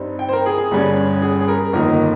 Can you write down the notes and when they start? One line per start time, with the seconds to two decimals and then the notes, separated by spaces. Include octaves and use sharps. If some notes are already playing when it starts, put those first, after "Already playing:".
Already playing: G2 G3 C4 D#4
0.19 G5
0.29 C5
0.33 A#4
0.46 G#4
0.58 G#4
0.71 G1 G2 G3 C#4
1.22 G#4
1.40 G#4
1.48 A#4
1.73 G1 F2 D#3 A#3 D#4 A#4
1.90 D#5